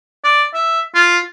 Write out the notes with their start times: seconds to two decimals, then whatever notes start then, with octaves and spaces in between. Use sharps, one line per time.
0.25 D5
0.54 E5
0.95 F4